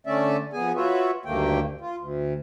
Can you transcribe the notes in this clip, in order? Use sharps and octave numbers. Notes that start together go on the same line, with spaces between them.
D3 A3 C#4 D5 E5
F2 B3 G#4 G#5
F4 F#4 B4 C#5 E5
D2 G2 D#3 A3 A#3 G5
F4
D2